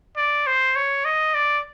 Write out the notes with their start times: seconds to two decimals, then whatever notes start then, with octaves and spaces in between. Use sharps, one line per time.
0.17 D5
0.46 C5
0.76 C#5
1.05 D#5
1.34 D5